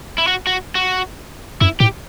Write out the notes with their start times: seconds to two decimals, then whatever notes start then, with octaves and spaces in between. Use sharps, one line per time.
0.18 E4
0.27 F#4
0.47 F#4
0.75 F#4
1.61 F#2 E4
1.80 A2 G4